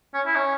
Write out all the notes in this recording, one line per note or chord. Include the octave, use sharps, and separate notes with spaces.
C#4
E4
C#4